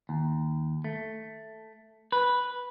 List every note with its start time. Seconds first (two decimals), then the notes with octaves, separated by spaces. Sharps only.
0.09 D#2
0.84 A3
2.12 B4